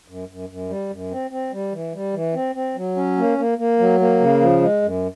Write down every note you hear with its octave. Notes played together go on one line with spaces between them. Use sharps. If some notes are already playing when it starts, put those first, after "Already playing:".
F#2
F#2
F#2
G3
F#2
C4
C4
G3
E3
G3
E3
C4
C4
F#3
C#4
A#3
A#3
A#3
F#3
A#3
C#3
F3
G#3
F#2